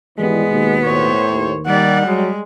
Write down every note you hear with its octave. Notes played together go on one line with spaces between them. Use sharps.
G#1 E3 G3 G#3 B3
D#2 B2
A2 C5 C#5
D#2
D#3 G3 D5 F#5
F#3 G#3